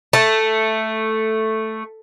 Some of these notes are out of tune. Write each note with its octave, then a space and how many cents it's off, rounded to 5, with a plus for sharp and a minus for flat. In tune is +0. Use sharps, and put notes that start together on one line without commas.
A3 +0 A5 +0